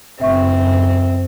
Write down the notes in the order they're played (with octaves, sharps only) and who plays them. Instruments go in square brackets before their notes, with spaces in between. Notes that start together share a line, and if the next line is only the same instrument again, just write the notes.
[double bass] F#1 F#2 [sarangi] C4 [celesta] E5 C#6